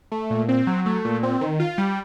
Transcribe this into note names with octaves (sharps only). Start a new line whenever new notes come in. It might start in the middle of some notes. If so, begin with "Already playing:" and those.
A3
A#2
C4
F#3
A3
A#2
C4
D#3
F4
G3